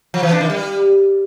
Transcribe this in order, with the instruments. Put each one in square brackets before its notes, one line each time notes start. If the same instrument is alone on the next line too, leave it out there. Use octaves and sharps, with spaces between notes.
[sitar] F3
E3
D4
D#3
G3